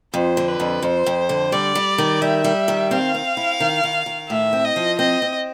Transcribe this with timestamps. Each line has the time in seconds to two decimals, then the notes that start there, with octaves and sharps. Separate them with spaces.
0.14 F2 C5
0.37 D3
0.48 B4
0.60 F2
0.83 F2 C5
1.06 F2
1.29 D3
1.52 G3 D5
1.75 G3
1.98 D#3
2.22 G3 E5
2.44 G3
2.68 D#3
2.91 C4 F5
3.14 C4
3.37 E4
3.60 D#3
3.84 D#3
4.06 D#3
4.29 A2 E5
4.53 C4
4.65 D#5
4.76 F3
4.99 C4 D#5
5.22 C4